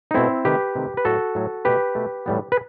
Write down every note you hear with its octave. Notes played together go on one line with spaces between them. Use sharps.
D#4
B2 A3 C4 E4
C3 D#3 A3 G4 B4
C3 D#3 A3
B4
A2 F#3 A3 F#4 A4
A2 F#3 A3
B2 A3 G4 B4
B2 A3
A2 E3 G3 B3
B4